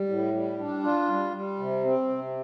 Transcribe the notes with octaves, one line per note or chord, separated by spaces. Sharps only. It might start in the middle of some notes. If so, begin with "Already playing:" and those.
Already playing: G3
A2
G3
D4
F4
G3
G3
C3
C4
C3